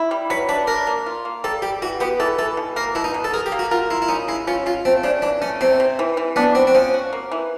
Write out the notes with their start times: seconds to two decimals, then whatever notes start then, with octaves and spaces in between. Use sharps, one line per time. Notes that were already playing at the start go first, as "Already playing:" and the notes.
Already playing: E4
0.11 G3
0.30 F#3 B4
0.49 D4 B4
0.68 D4 A#4
0.87 A#3
1.06 F4
1.25 A#3
1.44 G3 A4
1.62 G3 G4
1.82 E3 F#4
2.00 B3 G4
2.20 E3 A4
2.38 E3 A4
2.57 B2
2.76 A#3 A#4
2.95 B2 E4
3.04 D#4
3.14 B2
3.24 A4
3.34 G#4 A#4
3.46 G4
3.52 A#3
3.59 F#4
3.71 F4 A#4
3.90 E4 F4
4.02 E4
4.09 C#4 D#4
4.28 G#3 E4
4.47 C#4 F4
4.66 G#3 F4
4.85 A3 C4
5.04 C#3 D4
5.22 E3 D4
5.41 A3 C#4
5.61 C3 C4
5.80 C3
5.99 E3
6.17 E3
6.36 B3 D4
6.55 C4 F#4
6.67 C4
6.74 F3 C#4
6.94 F#4
7.13 A#3
7.32 E3